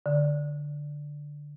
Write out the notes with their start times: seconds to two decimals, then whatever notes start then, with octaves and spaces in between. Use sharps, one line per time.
0.06 D3